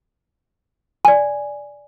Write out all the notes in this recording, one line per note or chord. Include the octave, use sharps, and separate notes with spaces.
D5 G#5